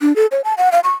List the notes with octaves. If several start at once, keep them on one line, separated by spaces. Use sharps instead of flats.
D4
A4
C#5
A5
F#5
F5
C#6